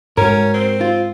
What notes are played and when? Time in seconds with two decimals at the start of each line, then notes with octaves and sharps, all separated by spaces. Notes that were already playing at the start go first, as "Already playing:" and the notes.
0.17 G#2 G#3 C#4 F#4 A#4
0.54 C4
0.81 F4